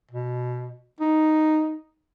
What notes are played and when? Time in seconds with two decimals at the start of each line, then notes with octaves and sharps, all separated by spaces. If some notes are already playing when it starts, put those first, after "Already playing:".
0.11 B2
1.00 D#4